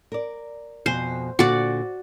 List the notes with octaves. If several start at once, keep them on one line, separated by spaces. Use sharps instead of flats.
A#4 D5
F2 B2 C5 G#5
A#2 D3 F#4 D5